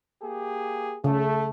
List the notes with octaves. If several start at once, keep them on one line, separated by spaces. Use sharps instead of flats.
A#3 G4 G#4
C#3 A3